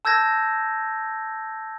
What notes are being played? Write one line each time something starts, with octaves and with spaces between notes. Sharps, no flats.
A5 E6 G6 G#6 A#6